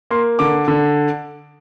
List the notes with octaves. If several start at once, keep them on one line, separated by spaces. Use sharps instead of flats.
A#3 C6
D3 D6
D3